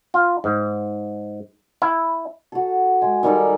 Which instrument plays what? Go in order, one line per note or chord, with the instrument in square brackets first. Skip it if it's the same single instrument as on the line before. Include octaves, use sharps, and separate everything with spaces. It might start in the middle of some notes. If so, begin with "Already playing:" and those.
[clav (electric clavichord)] F4
G#2
E4
[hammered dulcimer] F#4 A4
G#3
D#3 G3 A4 D5